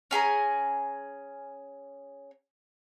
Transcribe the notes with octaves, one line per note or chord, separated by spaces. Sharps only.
C#4 G#4 G#5 A#5